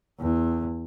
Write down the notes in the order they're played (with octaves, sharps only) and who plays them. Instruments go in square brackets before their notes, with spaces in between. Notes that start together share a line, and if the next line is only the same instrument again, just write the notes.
[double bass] E2